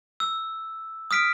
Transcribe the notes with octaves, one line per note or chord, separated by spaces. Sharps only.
E6
D#6 F6 B6 D7